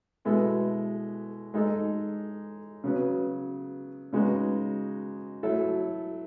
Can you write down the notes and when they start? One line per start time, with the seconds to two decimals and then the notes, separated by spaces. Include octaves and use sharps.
0.25 B2 G#3 B3 E4 A4
1.54 G#3 D#4 A4
2.84 C#3 F#3 B3
4.13 C#3 G#3 B3 D#4 F#4
5.43 F#3 A3 E4 A4